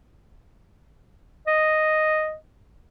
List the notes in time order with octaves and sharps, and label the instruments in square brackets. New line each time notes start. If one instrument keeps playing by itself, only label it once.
[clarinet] D#5